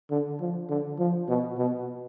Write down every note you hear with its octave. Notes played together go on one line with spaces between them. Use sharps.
D3
F3
D3
F3
B2
B2